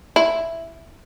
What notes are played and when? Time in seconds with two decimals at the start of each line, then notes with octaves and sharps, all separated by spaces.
0.16 E4